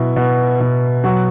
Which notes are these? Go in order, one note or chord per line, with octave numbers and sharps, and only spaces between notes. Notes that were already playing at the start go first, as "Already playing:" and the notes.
Already playing: B2 F#3 E4
B2
B2
F#3 F#4